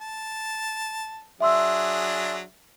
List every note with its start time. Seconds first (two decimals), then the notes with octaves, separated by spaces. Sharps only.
0.01 A5
1.41 F#3 D4 G#4 E5 C6 E6